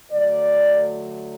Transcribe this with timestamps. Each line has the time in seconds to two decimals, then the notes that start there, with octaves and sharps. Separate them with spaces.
0.11 D3 F#3 A3 D5